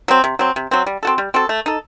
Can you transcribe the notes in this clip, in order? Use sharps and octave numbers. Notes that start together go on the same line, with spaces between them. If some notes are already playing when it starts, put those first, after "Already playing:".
F#3 C4
C3
F#3 C4
C3
F#3 C4
G3
C4 F#4 A4
G3
C4 F#4 A4
A3
D#4 A4